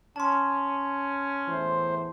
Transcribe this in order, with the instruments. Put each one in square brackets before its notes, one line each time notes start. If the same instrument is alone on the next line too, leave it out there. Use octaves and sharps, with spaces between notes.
[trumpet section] C#4 [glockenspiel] A5 C6
[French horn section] E2 A2 E3 [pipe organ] C5